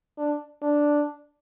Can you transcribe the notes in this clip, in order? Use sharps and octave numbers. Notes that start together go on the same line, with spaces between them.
D4
D4